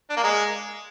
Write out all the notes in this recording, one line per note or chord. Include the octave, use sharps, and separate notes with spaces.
D4
A#3
G#3